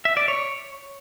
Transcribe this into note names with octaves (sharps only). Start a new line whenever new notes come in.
E5
D5
C#5